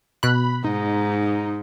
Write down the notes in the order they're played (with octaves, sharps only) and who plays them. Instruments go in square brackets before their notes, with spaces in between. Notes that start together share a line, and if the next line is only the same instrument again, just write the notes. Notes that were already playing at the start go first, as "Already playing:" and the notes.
[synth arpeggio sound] B2 F#6 [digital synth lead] B5
[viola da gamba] G#2 [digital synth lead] D#4